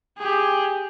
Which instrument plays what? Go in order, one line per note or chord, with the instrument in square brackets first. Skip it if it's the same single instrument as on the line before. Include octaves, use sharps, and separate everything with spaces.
[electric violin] G4 G#4